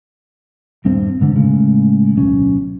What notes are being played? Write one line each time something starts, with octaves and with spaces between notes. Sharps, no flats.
D#1 G2 C4
G#2 D3
A2 C#3 G#3
D1 B1 C#4